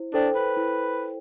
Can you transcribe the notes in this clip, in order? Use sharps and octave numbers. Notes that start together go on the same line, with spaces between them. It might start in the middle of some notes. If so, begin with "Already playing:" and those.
Already playing: E4 C5
D4 A4 C5 G5
B4
E4